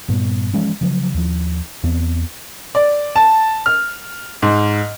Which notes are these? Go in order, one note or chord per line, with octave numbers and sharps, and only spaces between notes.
G2 A#2 G3 B3
E3 F3 G#3 C#4
C#3 F3 F#3
D#2 F3
E2 B3 C4
D5
A5
F6
G#2